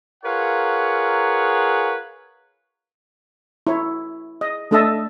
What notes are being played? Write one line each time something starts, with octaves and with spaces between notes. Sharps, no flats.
F4 G#4 A#4 B4 C#5 F#5
E4 C#5
D#5
A3 D4 A4 D#5 E5 A5